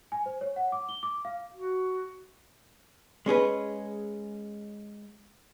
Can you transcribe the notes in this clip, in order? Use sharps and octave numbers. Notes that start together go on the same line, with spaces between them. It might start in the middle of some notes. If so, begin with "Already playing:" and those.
G#5
C5
C#5
F#5
D6
G7
D6
F5
F#4
G#3 C#4 G#4 B4